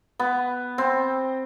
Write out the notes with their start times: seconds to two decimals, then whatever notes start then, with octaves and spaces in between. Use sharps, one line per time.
0.19 B3
0.78 C4